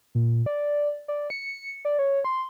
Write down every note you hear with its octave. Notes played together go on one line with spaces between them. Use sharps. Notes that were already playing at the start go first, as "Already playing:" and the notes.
A#2
D5
D5
C#7
D5
C#5
C6